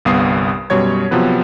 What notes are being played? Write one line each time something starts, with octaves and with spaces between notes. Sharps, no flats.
G1 C2 B3 F5 D#6 C7
F#2 B2 G3 C#5 G#6
C3 F3 F#3 B3 B4